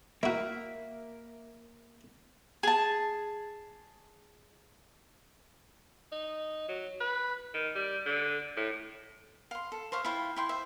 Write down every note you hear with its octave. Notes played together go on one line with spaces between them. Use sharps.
A#3 E4 F#4 E5 F#6
G#4 A5
D#4
F#3
B4
D#3
G3
D3
A2
F5 C6
A4
C5 C#5 E5 F5
E4 F4 F5 G5
E4 G5 C6
C5 E5